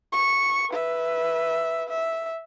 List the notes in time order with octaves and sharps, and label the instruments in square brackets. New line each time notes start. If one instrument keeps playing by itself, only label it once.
[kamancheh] C#6
B4 E5
E5